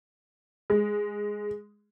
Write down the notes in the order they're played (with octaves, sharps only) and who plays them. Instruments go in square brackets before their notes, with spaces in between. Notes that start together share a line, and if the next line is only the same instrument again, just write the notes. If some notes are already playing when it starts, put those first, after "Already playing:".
[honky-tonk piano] G#3